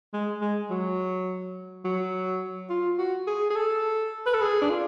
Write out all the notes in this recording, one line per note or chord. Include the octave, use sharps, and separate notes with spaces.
G#3
G#3
F#3
F#3
F4
F#4
G#4
G#4
A4
B4
A4
G#4
D4
F4